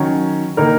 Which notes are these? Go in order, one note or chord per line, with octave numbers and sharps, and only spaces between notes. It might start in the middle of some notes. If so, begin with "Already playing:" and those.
Already playing: D#3 F#3 C#4
D#3 A#3 D#4 A#4